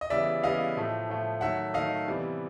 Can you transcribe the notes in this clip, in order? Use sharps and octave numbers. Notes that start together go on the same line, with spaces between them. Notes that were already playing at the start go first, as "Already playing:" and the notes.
D#5
C#3 E3 G3 B3 D5 E5
C#3 E3 G3 B3 D#5 F5
A2 F3 A3
A2 F3 A3
D#3 F#3 A3 E5 F#5
D#3 F#3 A3 D#5 F5
C3 E3 G3 B3